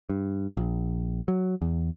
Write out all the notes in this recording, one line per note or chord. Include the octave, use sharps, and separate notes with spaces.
G2
A#1
F#3
E2